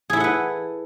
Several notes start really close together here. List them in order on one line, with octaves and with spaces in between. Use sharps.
G#4 E4 A4 F#5 B4